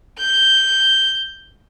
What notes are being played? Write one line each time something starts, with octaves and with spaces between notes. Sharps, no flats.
G6